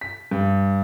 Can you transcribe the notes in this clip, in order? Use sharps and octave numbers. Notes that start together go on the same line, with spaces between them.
B6
G2